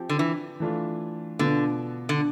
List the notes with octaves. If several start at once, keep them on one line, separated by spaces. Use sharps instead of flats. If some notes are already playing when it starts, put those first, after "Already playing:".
Already playing: F3 C4 G4
D3
E3
E3 A3 D4 F4
B2 D3 B3 F4
D3